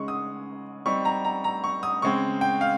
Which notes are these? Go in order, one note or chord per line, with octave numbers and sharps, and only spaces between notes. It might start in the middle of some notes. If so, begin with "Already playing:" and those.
Already playing: C#3 G#3 D#4 C#6
D#6
G3 C4 D#4 C#6
A#5
A#5
A#5
C#6
D#6
C#3 G#3 C4 C#6
G5
F5